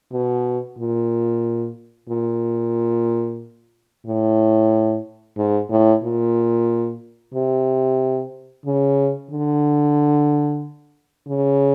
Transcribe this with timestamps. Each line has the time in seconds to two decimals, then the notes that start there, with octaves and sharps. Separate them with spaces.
0.12 B2
0.78 A#2
2.09 A#2
4.06 A2
5.37 G#2
5.70 A2
6.03 A#2
7.34 C3
8.65 C#3
9.31 D3
11.28 C#3